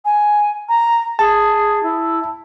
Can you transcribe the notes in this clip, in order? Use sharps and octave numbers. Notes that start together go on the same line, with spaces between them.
G#5
A#5
G#4 A5
E4